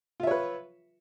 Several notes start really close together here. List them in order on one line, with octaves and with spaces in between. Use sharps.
F4 E5 C#5 B4